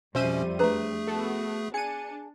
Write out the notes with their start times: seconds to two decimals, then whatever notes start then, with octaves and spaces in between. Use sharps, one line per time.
0.15 F2 B2 G3 C#4 C5 E5 D#7
0.59 A3 D4 G#4 B4 A#5
1.07 B3 F#4 A4
1.74 D4 G#4 C#7 D#7